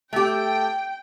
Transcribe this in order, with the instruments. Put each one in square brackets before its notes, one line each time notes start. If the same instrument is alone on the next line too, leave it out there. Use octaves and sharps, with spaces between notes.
[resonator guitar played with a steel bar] A3 G4 [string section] G5